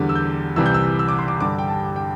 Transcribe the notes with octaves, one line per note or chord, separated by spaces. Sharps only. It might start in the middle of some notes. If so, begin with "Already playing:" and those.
Already playing: E2 D3 G3
E6
G6
C2 C3 E3 G3 E6
G6
E6
E6
D6
C6
D6
G2 D3 G3 D6
G5
A5
G5